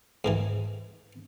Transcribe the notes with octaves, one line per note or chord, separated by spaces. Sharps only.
G#2 D#3 E3